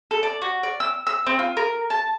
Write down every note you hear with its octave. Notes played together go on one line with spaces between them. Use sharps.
A4
D5
F#4
D5
E6
E6
C4
F4
A#4
A5